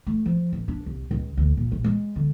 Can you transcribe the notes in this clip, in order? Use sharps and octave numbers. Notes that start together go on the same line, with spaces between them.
A3
F3
A1
D4
C2
C#2
D2
A#2
A#1
G#3
D3